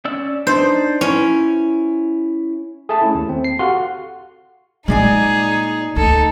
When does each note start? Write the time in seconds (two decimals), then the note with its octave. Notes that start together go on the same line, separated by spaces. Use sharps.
0.05 C#4 D5 E6
0.47 D4 D#4 C5 D5
1.01 C#4 E4
2.89 G#4 A4 E5 A5
3.01 A3 C#4 E4
3.15 D#2
3.29 C4
3.44 C7
3.59 F#4 G4 A4 F5 F#5 C6
4.88 A#2 G#3 D#4 G#4 D5 G#5
5.96 D2 D#4 A4